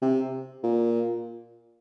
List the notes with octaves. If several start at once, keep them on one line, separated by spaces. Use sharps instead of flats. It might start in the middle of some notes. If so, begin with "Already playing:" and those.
C3
A#2